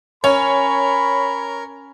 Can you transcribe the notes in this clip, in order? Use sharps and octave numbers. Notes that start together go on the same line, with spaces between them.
C#4 A#4 C#5 B5